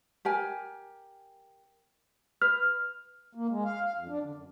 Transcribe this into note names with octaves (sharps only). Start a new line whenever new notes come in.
G4 A#4 G#5
B4 F6
A#3
G#3
F5
F5
F2
D4
D3
F#2